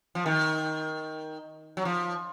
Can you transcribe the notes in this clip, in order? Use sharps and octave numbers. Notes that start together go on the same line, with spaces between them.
F3
D#3
F#3
F3